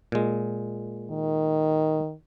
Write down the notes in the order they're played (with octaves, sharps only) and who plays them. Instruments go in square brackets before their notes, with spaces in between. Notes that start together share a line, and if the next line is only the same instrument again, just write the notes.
[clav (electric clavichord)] A#2 G#3
[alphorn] D#3